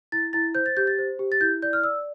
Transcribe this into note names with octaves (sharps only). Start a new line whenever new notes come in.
E4 A6
E4 A6
C5 G6
A6
G4 G6
A6
C5
G4
A6
E4 G6
D5 G6
F6
D5 E6